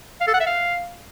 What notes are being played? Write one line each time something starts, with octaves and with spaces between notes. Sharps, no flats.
F5
A4
F#5
E5
F5